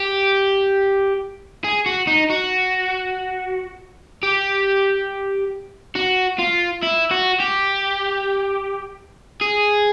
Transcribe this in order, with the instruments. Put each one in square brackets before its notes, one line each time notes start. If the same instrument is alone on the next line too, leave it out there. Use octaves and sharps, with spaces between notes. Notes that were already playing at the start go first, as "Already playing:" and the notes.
Already playing: [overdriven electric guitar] G4
G#4
F#4
D#4
F#4
G4
F#4
F4
E4
F#4
G4
G#4